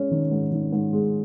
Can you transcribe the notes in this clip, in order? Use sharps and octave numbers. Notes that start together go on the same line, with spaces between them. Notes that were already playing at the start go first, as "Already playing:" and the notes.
Already playing: G#3 C#4
D#3
G#2
D#3
G#2
G#3